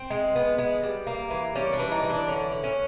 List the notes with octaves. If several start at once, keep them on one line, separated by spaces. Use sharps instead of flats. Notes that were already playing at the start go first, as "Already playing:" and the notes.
Already playing: C4
G#3
B3
G#3
G3
A#3
E3
G3 C#4
D4
E3
D#4
E3
D4
D3 C#4
D3
C#4